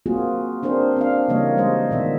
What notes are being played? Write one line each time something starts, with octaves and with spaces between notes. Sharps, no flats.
A#3 C4 F4 F#4 G#4
C4 D4 G#4 A#4 C5
C4 D4 F5
C#3 E3 G3 A#3 C#5 D#5
G3 G#3 G#4 C5 D#5
A#2 D#3 B3 E5